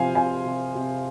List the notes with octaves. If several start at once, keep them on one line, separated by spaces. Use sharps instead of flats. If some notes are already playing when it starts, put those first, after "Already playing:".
Already playing: C3 F3 C5 F5 G#5
C3 F5 G#5
C3
C3